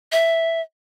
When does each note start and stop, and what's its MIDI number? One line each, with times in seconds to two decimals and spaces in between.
0.12 0.61 76